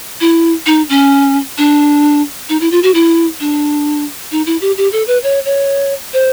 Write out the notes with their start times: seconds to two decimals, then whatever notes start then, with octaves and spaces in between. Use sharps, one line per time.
0.21 E4
0.66 D#4
0.90 C#4
1.58 D4
2.49 D#4
2.61 E4
2.72 F4
2.83 F#4
2.94 E4
3.40 D4
4.32 D#4
4.46 E4
4.61 G4
4.78 G4
4.92 A4
5.07 B4
5.23 C#5
5.45 C#5
6.13 C5